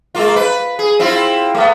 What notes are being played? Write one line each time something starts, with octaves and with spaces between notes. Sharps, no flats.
G#3 A#3 F4
B4
G#4
C4 E4 F4
A3 B3